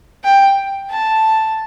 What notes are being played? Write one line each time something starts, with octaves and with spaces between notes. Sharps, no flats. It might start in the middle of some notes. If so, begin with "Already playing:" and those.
G5
A5